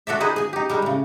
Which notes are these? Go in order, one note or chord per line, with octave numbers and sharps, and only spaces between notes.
F#4 A4 D5 E5
D#4 G#4 B4 C5
G#4 G#5
D#4 G4
G3 G#3 D#4
A2 C#3